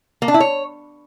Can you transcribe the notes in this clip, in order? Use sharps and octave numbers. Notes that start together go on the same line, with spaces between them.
A#3
D4
E4
C#5